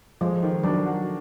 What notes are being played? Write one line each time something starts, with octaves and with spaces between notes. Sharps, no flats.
F3 G#3
D#3
F#3 D4
F#4